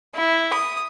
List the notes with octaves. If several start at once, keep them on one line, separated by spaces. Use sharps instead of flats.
E4
D#6